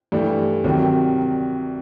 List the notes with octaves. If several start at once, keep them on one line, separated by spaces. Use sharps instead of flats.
G2 E3 A3
C2 C3 D#3 F#3